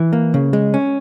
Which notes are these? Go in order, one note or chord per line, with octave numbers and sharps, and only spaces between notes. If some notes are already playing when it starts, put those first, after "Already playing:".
Already playing: E3
A#3
C#3
G#3
C#4